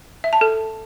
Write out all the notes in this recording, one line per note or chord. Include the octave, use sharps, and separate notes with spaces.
E5
A5
A4